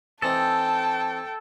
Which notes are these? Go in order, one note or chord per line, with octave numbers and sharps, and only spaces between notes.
E3 C4 D#4 A4 G5 A5